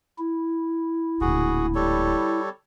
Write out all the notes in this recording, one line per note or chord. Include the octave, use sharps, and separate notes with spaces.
E4
D1 A#2 F#4 G#4
G3 A4 C#5